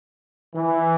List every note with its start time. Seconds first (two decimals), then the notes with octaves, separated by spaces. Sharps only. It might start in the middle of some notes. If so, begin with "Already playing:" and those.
0.55 E3